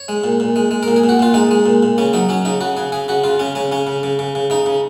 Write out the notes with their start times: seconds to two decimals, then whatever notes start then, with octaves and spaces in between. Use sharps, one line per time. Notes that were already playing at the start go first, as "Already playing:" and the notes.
Already playing: C#5
0.08 G#3
0.24 A#2
0.40 A#2
0.56 G#3
0.71 G#3
0.83 A#4
0.88 A#2
0.96 G#4
1.04 A#2
1.09 F#4
1.19 A#2 F4
1.34 G#3 D#4
1.51 G#3
1.66 A#2
1.83 A#2
1.98 C#3 C#4
2.13 F#3 D#4
2.29 F#3 C#4
2.45 C#3 D#4
2.61 C#3 F#4
2.77 C#3 G#4
2.92 C#3 G#4
3.08 C#3 F#4
3.24 C#3 F4
3.39 C#3 C#4
3.55 C#3 C#4
3.72 C#3 C#4
3.87 C#3
4.03 C#3
4.19 C#3
4.35 C#3
4.50 C#3 D#4
4.66 C#3